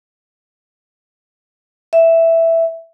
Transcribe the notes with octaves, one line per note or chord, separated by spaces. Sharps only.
E5